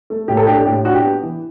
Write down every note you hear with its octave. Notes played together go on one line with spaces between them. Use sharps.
A3
A2 G4
A4
D4 G4
A2 G4
D4 F#4
G4
B3
E3